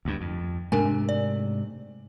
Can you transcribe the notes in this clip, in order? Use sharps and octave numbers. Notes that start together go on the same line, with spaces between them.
D2 G2
F2
G#2 C3 A3 D4 A#4 G#5
D5